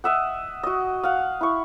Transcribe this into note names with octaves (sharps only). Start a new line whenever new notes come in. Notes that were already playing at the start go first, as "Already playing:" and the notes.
D#5 E5 F#5
F#4 D#5
F5 F#5
E4 C#6